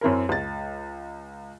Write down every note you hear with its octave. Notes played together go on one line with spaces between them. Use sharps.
F#2 C4 E4 A#4
C#2 A6